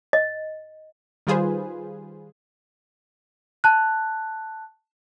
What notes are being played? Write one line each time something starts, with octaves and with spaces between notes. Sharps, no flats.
D#5
D#3 G3 F4 G#4 B4 C5
A5 F#6